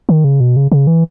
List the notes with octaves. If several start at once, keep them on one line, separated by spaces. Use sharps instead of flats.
D#3
C#3
B2
C#3
C#3
E3